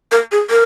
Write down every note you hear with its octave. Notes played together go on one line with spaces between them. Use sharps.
A#4
G#4
A#4